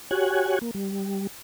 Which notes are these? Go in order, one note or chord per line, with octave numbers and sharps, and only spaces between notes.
F#4 G4 C#5 G#5 F#6
A#3
G3